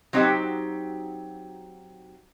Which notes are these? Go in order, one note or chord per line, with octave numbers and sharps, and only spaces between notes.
F#3 C4 D#4 F#4 G4